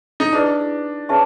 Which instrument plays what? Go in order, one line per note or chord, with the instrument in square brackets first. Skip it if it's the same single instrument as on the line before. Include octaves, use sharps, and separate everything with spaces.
[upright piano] D#4
[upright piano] D4 [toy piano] E4 G#4 B4 D5
[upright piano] C#4 [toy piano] G#4 B4 E5 A5 C#6